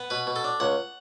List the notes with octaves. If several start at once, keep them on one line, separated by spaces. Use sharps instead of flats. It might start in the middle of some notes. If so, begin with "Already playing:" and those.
Already playing: B3
B2 B4
B2
A4
D4
C#2 F#5